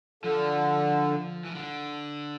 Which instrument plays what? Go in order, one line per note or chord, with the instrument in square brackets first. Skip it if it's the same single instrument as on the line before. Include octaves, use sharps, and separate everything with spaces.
[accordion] D3 [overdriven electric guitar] F3
[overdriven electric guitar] E3
D3